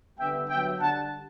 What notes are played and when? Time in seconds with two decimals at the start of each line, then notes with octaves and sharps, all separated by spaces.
0.18 D3 G3 B3 E5 G5
0.49 D3 F#3 B3 E5 G5
0.79 D3 G3 D4 F#5 A5